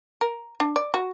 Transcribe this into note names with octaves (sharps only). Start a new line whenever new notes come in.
A#4
D4
D5
F#4